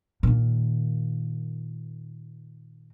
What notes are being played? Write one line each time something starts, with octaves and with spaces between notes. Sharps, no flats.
A#2 D#3